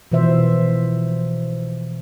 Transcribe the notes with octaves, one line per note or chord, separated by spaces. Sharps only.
B2 E3 F3 C5 E5